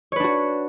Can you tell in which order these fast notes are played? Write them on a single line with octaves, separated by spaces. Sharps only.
C#5 B4 D4 F#4